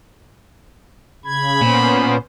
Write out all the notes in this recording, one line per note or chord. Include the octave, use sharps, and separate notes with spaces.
C#3 B5 G#6
A#2 B3 C#4 C5